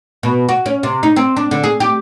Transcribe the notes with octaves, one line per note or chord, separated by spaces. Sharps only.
B2
F#4
C#4
C3
D#4
C4
D4
D3
G#4
G4